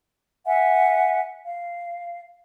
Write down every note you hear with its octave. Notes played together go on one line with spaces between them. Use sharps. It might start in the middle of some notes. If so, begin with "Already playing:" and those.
E5 F#5 G#5
F5